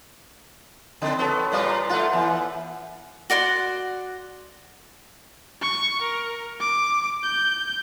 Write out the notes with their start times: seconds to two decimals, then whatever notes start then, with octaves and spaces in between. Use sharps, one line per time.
1.02 C#3 C4
1.19 B3 A4 B4 C#5
1.52 A#2 G3 F4 B4 C5 D5
1.68 A#5
1.89 A3 F4 E5 F#5 C6
2.13 E3 B3
3.30 F#4 D5 F#5 C6
5.61 C#6
6.02 A#4
6.60 D6
7.23 G6